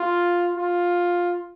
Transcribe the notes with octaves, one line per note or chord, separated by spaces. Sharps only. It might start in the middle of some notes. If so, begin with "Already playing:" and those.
Already playing: F4
F4